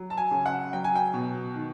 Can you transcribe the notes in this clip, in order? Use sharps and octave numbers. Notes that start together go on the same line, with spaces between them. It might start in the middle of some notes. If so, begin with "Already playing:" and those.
Already playing: F#3
A5
G#5
C#3
F#5
F#3 G5
G#5
G5
B2
D#3